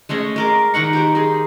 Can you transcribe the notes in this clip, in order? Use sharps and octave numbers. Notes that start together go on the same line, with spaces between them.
G#3 A3 C#4 D#5
G#3 A#4 D6
D#3 D#4 F#5 C#6
G4 A#4 C5
D#4 G#4